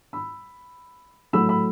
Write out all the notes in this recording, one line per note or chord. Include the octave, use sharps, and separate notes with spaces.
B5 E6
A2 F#3 A3 B5 E6
B5 E6